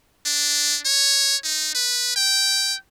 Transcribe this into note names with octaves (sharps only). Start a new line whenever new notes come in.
D4
C#5
D#4
B4
G5